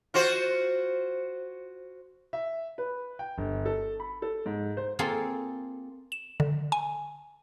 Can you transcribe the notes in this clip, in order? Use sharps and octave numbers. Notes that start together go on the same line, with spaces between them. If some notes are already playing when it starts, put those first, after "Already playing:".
F4 F#4 C5
E5
B4
G5
G1
A4
B5
A4
G#2
C5
A#3 C4 F4 G#4 A4
E7
D3
G#5